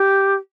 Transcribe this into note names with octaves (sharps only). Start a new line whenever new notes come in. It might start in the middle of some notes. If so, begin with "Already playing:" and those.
Already playing: G4